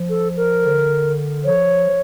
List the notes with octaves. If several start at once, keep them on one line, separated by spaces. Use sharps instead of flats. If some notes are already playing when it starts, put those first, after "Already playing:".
Already playing: F3
A4
A#4
D3
F3 C#5